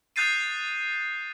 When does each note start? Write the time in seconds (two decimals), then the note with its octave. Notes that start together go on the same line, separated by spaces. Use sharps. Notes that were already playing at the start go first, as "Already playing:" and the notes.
0.16 D#6 F#6 G6 A6 C7 D#7